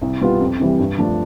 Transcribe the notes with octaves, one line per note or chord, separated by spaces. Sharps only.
C2
B2 G3 B3 F4
F2
C3 E3 G3
G2
F3 A3 D4